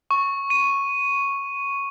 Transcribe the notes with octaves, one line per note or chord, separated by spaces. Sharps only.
C#6
D#7